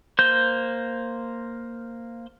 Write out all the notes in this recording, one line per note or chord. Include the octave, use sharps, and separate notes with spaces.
A#3 C5 G6